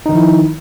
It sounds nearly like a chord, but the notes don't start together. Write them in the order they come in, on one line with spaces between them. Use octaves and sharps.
D#4 D#3 F3 E4